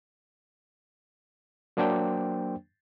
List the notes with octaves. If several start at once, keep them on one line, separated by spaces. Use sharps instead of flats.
F#3 A#3 D4 C5 G5